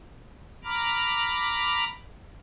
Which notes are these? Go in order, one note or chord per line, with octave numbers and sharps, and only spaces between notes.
A#5 B5 D6 F6